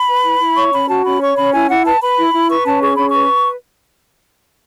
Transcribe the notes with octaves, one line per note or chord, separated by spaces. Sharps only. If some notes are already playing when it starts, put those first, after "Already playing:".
Already playing: B5
B4
E4
E4
C#5 C#6
C#4 B5
F#4 A5
C#4 B5
C#5 C#6
C#4 B5
E4 G#5
E4 F#5
B4 A5
B4 B5
E4
E4
B4 C#6
C#4 A5
G#4 C#6
C#4 B5
C#6
B4